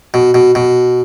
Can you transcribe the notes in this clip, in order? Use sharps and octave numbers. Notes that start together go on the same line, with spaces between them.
B2
B2
B2